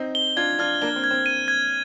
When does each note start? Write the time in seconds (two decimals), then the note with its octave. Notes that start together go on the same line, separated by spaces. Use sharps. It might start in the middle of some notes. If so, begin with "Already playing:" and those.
Already playing: C4 D#4
0.15 G7
0.36 D4 F4 G#6
0.59 D4 F4 F6
0.81 A#3 D4 G7
0.96 C4
1.04 G#6
1.11 C4
1.26 D#7
1.48 G#6